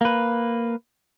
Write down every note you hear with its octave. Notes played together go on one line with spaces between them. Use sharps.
A#3 B4